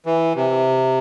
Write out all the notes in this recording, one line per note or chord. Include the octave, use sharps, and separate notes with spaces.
E3
C3